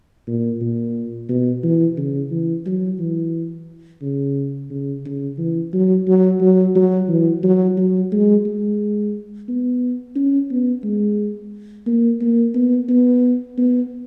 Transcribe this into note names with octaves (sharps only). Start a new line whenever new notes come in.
A#2
A#2
B2
E3
C#3
E3
F#3
E3
C#3
C#3
C#3
E3
F#3
F#3
F#3
F#3
E3
F#3
F#3
G#3
G#3
B3
C#4
B3
G#3
A#3
A#3
B3
B3
B3